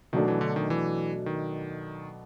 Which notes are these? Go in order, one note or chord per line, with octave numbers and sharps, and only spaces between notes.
B2 D#3 F#3 A3 D4
E3
D3
D#3
E3
D#3